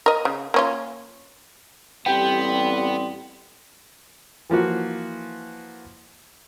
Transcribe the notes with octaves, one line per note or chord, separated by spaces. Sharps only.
A#4 D#5
C#3
A#3 C#4 F4
A1 G3 B3 C4 G4 G5
E3 F3 A#3 F#4